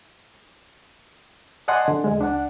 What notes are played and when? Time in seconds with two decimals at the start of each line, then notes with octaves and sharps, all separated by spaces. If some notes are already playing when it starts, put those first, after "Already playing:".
1.68 D5 D#5 F#5 G#5 A5 C6
1.88 D3
2.04 E2 G#3
2.19 C#2 D4 F#5